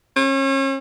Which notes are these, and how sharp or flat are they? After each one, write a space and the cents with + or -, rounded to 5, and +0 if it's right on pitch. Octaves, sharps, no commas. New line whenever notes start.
C#4 -35